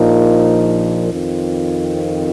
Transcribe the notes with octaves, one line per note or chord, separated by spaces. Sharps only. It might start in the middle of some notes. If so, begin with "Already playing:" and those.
Already playing: A#1 A#2 F3 A#3 D#4
F2 D#3 C4 F4